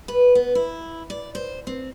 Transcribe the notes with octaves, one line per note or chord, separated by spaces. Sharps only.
B4
B3
E4
D5
C5
C4